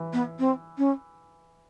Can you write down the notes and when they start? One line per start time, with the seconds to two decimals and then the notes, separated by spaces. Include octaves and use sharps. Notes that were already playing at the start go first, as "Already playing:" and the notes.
Already playing: E3
0.13 B3
0.39 C4
0.78 C#4